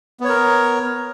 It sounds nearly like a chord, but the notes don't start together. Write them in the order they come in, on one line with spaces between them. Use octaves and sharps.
B3 C#5 A#4